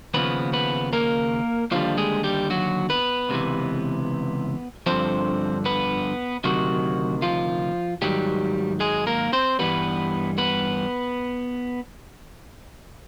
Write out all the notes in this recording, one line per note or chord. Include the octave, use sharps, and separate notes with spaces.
D#2 C#3 F3 B3 B4
B3 B4
A#3 A#4
D#2 D3 F3 G3 F4
G#3 G#4
G3 G4
F#3 F#4
B3 B4
C#2 C3 E3
G2 D3 F3 C4 C5
B3 B4
D2 C3 D#3 F#3 F#4
F3 F4
G#2 D#3 F#3 G3 G4
G#3 G#4
A#3 A#4
C4 C5
G2 E3 G3 B3 B4
B3 B4